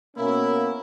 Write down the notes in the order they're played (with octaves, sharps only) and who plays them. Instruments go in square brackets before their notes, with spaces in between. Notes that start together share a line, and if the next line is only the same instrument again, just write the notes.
[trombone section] B2 A#3 C#4 F#4 A#4 [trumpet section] E4